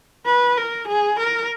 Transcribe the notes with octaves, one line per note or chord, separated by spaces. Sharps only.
B4
A#4
G#4
A#4